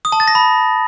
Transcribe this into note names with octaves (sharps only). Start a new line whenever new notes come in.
D#6
A5
A6
A#6
B5